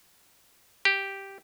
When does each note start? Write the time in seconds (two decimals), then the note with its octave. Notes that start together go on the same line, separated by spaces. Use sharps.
0.85 G4